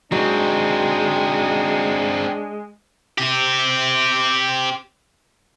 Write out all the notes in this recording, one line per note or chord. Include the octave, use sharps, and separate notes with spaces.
F#3 G#3 C4 D4 D#4
C4 G4